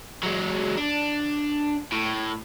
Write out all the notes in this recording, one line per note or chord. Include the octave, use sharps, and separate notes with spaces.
F#3 G#3
D4
A2